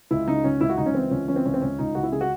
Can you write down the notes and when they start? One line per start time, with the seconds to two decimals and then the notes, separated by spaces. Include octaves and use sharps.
0.11 C#2 E4
0.28 C#3 D#4
0.44 C#2 C#4
0.61 C#2 E4
0.69 F#4
0.77 C#2 D#4
0.86 C#4
0.94 E3 C4
1.11 C#2 C#4
1.28 E3 C#4
1.36 C4
1.45 C#2 C#4
1.54 C4
1.61 C#2 C#4
1.79 C#2 D#4
1.95 C#2 F#4
2.03 E4
2.12 C#3 G#4
2.21 F#4